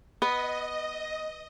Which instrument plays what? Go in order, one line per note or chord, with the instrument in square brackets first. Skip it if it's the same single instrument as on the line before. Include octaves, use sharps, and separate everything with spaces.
[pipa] B3 [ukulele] B4 [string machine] D#5